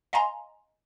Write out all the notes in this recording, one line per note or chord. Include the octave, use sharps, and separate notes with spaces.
D#5 F5 G#5 A#5 C6